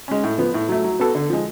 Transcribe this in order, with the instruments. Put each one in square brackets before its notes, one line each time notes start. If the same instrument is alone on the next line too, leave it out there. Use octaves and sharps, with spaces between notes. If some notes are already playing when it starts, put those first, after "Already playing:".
[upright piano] G#3 C#4
A2
F3 B3
A2
F#3 A3
F#3
B3 F#4 A4
D3
F3 G#3